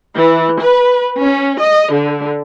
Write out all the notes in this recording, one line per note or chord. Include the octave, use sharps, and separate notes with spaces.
E3
B4
C#4
D#5
D3